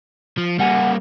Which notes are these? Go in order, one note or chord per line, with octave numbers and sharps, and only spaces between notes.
F3
C#3 G3 A#3 F#5 G#5